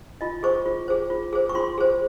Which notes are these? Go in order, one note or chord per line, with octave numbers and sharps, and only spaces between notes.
F4 D#5
G#4 C5 C#6
F4
G#4 C5
F4
G#4 C5
C#6
F4 C6
G#4 C5